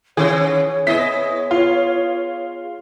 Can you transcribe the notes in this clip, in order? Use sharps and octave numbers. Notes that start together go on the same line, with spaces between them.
D#3 C#4 G#4 C#5
B3 E4 G#4 C#5 D#5 B6
F4